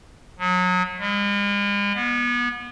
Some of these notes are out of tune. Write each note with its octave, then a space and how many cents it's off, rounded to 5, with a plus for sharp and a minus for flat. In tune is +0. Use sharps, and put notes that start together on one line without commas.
F#3 -30
G#3 -45
B3 -30